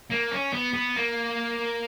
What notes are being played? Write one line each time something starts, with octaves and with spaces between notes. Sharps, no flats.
A#3
C#4
B3
B3
A#3